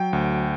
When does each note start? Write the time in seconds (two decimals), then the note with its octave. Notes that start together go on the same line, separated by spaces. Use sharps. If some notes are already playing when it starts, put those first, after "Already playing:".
Already playing: F#3 G5
0.13 D2